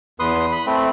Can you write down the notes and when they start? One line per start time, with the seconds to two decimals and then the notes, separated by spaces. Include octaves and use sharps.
0.20 E2 B4 C6 D#6
0.52 B5
0.66 A3 C4